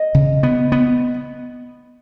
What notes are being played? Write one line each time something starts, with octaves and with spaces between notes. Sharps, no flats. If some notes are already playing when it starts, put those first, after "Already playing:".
Already playing: D#5
C#3
B3
B3